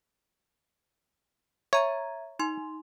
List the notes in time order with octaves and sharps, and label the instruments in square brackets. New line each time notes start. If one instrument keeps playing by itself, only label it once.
[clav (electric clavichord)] C#5 [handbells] E5 A#5 G#6
[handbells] D#4 C6